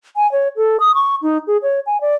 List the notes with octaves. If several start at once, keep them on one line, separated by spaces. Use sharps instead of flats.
G#5
C#5
A4
D#6
C#6
D#4
G#4
C#5
G#5
D5